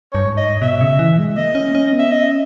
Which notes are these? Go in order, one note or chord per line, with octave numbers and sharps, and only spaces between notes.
G2 C#5
G#2
D#5
B2 E5
C#3
E3
G#3
A#3 D#5
C#4
C#4
B3
E5
C#4 D#5